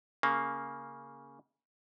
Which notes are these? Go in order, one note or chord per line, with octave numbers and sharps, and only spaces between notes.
C#3 A#3